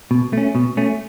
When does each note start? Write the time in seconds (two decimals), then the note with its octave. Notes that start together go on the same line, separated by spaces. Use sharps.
0.11 B2
0.33 A3 C#4
0.55 B2
0.77 A3 C#4